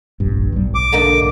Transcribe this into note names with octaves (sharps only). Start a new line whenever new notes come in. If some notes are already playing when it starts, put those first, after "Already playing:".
F1 A#1 G2
B1 G#2 G3
D6
D3 A#3 D#4